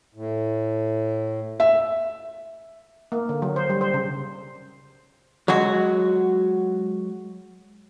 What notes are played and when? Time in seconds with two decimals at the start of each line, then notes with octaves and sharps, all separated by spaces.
0.14 A2
1.60 E5
3.12 A#3
3.29 D3
3.42 F#3
3.56 C5
3.69 G3
3.81 C5
3.94 C#3
5.48 F#3 G#3 F#4